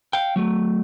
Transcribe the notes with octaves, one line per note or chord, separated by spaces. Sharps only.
F5 G5
F#3 A3